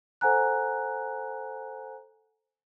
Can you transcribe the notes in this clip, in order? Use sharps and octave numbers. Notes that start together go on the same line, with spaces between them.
A4 C5 F#5 G#5 A#5 F#6